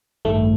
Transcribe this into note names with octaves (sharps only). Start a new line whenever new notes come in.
A1 G2 D#3 A3